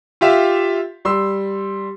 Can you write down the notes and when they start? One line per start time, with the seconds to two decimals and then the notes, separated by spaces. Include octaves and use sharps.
0.21 F4 G4 E5 F5
1.05 G3 C6 E6